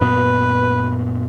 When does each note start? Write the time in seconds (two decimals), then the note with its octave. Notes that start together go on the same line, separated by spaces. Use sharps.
0.01 F#2 A#2 B3 B4